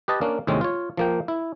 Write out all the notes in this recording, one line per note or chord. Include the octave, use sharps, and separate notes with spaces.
G4 B4 D#5 A5
A#3 C#4 D4
D#2 A2 C3 G#3 C4 C#4
F4 C#5
F3 A#3 G5
E4